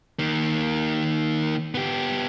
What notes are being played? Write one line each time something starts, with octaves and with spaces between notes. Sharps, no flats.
D#3 A#3
B3 G4